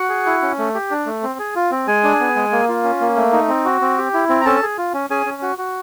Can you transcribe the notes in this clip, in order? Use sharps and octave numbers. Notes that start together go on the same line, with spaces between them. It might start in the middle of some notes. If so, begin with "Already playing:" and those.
Already playing: F#4 F#5
G#4
E4
C#4
A3
G4
D4
A3
C4
G#4
F4
C4
G#3 G#4 G#5
D4
B3
G#3
A#3
F4
C#4
A#3
A3
D#4
C4
F#4
C4
G4
E4
C4
A#5
C#4 A4 A5
G#4
F4
C#4
C#4 G#4 G#5
C#4
F#4
F#4